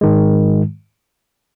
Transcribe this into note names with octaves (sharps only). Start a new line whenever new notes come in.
G#2 D#3 G#3